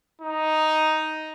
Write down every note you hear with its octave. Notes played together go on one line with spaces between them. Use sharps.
D#4